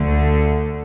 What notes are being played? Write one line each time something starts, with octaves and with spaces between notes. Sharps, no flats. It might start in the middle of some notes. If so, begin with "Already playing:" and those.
Already playing: D2 D3 A3